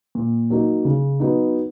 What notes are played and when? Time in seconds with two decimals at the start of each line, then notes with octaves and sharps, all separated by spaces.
0.15 A#2
0.50 F#3 A#3 D#4
0.85 C#3
1.20 F#3 B3 D#4